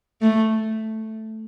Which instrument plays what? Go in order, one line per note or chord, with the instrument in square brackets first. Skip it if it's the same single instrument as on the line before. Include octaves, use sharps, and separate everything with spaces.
[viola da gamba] A3